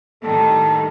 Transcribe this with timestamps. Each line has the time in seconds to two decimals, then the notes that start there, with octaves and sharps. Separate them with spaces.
0.23 A2 D#3 G3 A4